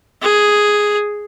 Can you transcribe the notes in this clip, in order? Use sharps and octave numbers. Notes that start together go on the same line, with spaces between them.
G#4